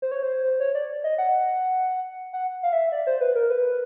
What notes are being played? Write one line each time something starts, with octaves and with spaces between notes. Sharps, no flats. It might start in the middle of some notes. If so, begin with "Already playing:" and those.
C5
C#5
C5
C#5
D5
D#5
F#5
F#5
F5
E5
D5
C5
B4
A#4
B4